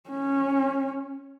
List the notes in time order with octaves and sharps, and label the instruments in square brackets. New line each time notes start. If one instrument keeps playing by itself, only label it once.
[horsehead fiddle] C#4